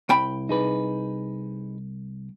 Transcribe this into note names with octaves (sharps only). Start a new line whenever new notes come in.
C2 G5 B5
D#4 G#4 B4